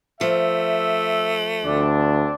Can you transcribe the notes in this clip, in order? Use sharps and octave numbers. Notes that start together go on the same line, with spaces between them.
F3 A3 E5
D2 C4 D4